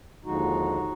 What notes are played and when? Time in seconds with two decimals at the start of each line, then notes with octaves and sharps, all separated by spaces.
0.25 D#2 D3 F3 G#3 D#4 F#4